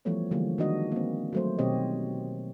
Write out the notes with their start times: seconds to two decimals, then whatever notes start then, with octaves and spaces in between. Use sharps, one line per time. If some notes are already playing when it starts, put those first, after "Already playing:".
0.05 E3 F3 G3 A3 B3 C#5
0.31 D3 E3 F3 G3 G#3 A#3
0.58 D#3 G#3 D4 F#4 D#5
0.92 A#3 C4
1.33 F#3 A3 C5
1.58 B2 D#3 C4 G4 C#5 D#5